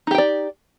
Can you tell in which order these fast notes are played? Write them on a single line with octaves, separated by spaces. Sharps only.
D#4 G4 G5 D5